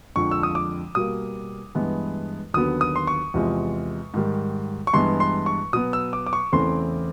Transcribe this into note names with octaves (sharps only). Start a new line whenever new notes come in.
F2 D3 F3 G#3 C#6
E6
D#6
D6
B2 G3 A#3 D#6
G2 E3 G#3 B3
D#2 D3 F#3 B3 D#6
D#6
C6
C#6
E2 C3 F3 G#3
G#2 D#3 G3
C#6
G2 E3 G#3 B3 C6
C6
C#6
B2 F#3 B3 D#6
E6
D6
D6
C#6
E2 C#3 E3 A3 C4 C6